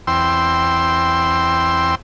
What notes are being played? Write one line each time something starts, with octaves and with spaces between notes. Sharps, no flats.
E2 C4 G5 C6 E6